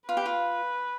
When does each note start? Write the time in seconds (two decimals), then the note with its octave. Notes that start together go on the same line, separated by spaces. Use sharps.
0.09 F4 B4
0.17 G4
0.26 F4